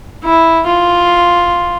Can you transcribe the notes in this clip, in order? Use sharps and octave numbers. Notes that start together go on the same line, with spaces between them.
E4
F4